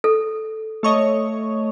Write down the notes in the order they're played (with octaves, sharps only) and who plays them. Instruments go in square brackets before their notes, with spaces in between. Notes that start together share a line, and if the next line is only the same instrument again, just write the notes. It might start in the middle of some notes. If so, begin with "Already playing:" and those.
[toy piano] A4
[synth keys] A3 C#5 D#5